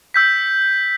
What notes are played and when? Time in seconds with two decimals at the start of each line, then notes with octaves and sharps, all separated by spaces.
0.14 E6 G6 B6